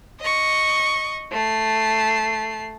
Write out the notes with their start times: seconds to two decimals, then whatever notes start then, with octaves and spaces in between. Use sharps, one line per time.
0.20 D#5 C#6
1.31 A3 C7